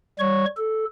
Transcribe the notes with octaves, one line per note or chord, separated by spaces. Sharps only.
G3 C#5 C#6
A4